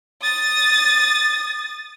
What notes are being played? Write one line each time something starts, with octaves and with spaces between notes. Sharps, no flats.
D#6 A6